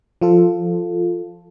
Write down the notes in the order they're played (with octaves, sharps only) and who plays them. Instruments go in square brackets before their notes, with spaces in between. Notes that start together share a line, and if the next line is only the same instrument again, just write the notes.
[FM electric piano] F3 F4 A4